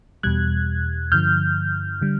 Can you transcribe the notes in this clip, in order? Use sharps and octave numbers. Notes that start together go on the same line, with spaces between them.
E2 B2 G3 F#6 G#6
G2 D3 F3 F6 G6
D3 G3